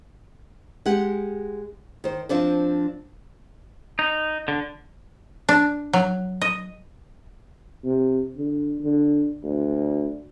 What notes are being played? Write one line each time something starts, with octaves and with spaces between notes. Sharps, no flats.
G#3 G4 F#5
D#3 C5
F3 C4 D4 C5
D#4
D3
D4
F#3
D#5
C3
D3
D3
D2